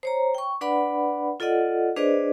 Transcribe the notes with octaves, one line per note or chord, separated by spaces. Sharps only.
C5 C#5 A#5
G5 C#6
D4 B4 D5 F#5 B5
F4 A4 D5 D#5 F#5
D4 G#4 B4 C5 D5 D#5